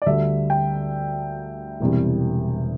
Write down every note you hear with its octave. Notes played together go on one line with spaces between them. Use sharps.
D5
D2 D3 G3 D4 E5
G5
E1 E2 C3 G3